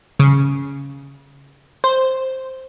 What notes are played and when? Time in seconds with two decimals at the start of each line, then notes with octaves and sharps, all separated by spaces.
0.20 C#3
1.84 C5